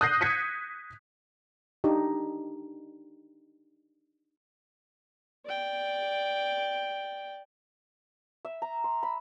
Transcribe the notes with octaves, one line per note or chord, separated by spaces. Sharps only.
D#6 F#6 G6 A#6 C7
G#6 B6 C#7 D#7
D4 D#4 G4
D5 G5
E5
A#5
C6
B5